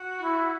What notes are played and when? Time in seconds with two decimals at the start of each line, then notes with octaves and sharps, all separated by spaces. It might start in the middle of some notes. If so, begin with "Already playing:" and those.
Already playing: F#4
0.20 E4